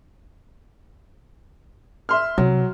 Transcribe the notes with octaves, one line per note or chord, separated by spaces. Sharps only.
E5 C6 F6
C3 F#3